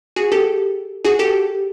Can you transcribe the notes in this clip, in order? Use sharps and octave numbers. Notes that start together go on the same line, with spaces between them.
F#4 G#4
G4 A4
F#4 G#4
G4 A4